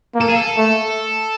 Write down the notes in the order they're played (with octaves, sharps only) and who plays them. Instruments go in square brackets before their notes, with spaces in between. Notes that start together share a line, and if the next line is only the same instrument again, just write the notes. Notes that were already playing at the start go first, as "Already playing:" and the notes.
[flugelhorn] A#3
[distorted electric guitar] A4
G#4
A4
[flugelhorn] A3